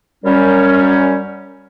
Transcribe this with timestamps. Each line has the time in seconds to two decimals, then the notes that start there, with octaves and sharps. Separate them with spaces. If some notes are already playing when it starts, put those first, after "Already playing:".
0.24 F#2 G3 C#4